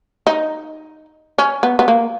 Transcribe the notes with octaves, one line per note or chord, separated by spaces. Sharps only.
D#4
C#4
B3
B3
A#3